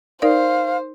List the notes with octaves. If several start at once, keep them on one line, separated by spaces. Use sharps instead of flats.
D#4 A#4 C5 D5 F5